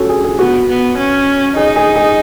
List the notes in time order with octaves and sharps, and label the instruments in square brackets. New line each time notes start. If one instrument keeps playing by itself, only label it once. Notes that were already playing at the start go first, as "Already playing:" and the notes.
Already playing: [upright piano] C#4 F#4 A4
G#4
G#4
[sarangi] B3 [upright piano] F#4
[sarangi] B3
C#4
[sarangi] D#4 [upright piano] G#4
[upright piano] G#4
G#4